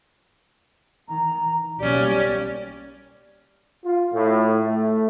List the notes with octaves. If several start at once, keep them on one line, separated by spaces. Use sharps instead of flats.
D#3 A#5
E3
B1 G3 A#3 C#4 G4 D5
F4
A2
A3